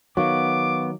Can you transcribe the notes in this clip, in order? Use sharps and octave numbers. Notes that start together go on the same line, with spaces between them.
D#3 F#3 B3 F5 C#6 D6